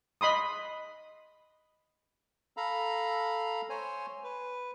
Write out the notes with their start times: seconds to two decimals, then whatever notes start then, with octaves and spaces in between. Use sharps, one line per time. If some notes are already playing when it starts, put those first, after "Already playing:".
0.21 D#5 B5 C6 D#6
2.57 A4 F5 A#5 B5
3.70 C5 C#5 G#5
4.24 B4